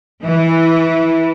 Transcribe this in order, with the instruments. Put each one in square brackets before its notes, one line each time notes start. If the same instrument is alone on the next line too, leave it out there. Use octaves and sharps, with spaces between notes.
[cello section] E3